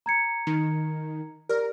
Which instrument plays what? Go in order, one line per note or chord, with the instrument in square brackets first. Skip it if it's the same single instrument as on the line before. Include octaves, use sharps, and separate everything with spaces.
[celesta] A#5 G#6 C#7
[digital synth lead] D#3
[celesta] G4 D5 F6 [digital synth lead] A#4